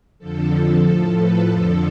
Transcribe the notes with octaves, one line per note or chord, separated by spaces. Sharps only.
F2 D3 F3 A4
A4
A2 F3
B4
F2 D3 F3 A4